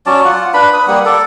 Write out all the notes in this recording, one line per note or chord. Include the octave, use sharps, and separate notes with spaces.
F#3 C#4 D5 A5
F4 F#5
D4 B4 B5
B4 D#6
G3 A#3 F#5
A4 D5